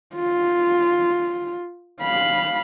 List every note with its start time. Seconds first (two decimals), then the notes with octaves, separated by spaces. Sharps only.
0.16 F4
2.01 F5 B5